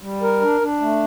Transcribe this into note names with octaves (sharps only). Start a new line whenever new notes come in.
G3
A#4
D4
D4
A3